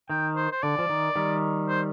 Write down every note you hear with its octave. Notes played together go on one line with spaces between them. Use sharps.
D#3 G5
C5
C5
D3 D5
F3
D#3
D#3 G3
C5